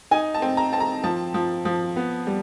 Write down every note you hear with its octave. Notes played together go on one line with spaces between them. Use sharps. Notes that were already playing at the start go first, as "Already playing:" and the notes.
D#4 G#5
A5
C4
A#5
C4 A5
A#5
F3 A5
F3
F3
B3
G3